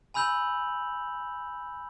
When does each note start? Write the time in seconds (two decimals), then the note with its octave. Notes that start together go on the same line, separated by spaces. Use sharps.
0.14 G#5 B5 E6 G6 F7 F#7